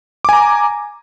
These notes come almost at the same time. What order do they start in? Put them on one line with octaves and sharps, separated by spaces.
D6 G#5 A#5